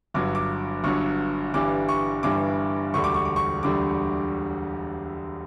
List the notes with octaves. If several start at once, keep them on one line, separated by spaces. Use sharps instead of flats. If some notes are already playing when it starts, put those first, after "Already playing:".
G1 G2 F#3 D6
D6
G1 G2 F#3 C#6
G1 G2 E3 G3 D6
C#6
G1 G2 E3 G3 D6
E1 D2 D3 G3 C#6
D6
C#6
D6
C#6
E1 D2 D3 G3 D6